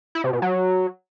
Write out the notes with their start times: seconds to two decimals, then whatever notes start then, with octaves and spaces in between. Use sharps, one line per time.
0.15 E4
0.24 C3
0.33 B2
0.42 F#3